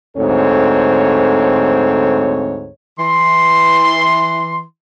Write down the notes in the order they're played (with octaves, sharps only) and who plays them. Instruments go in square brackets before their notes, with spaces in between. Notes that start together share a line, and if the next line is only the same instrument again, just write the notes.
[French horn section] D2 G#2 C4 A4 C#5
[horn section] E3 C6